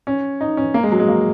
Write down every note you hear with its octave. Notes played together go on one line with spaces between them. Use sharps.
C#4
D#4
C#4
A#3
G#3
F#3
G#3
A#3